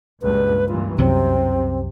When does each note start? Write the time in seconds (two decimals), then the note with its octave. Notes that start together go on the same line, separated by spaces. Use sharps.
0.22 C#2 G2 A#2 B4
0.68 G2 A#2 E3 F4
0.98 C2 F#2 C3 F#3 C4